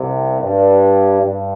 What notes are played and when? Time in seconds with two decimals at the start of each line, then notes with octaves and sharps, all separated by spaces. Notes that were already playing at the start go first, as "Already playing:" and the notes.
Already playing: C2 C3
0.42 G2
1.22 G2